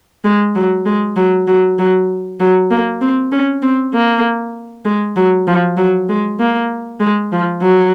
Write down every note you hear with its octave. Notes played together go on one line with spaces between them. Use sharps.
G#3
F#3
G#3
F#3
F#3
F#3
F#3
A#3
C4
C#4
C4
A#3
G#3
F#3
F3
F#3
G#3
A#3
G#3
F3
F#3